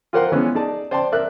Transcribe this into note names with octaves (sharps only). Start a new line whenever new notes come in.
F4 G4 A#4 C5 F#5 C6
E3 G#3 B3 C#4
D#4 G#4 D5 A5
C5 D5 G5 A5 C6
A#4 D5 E5 F#6